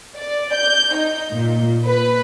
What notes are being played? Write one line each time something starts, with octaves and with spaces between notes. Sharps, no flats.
D5
G6
D#4
A#2
B4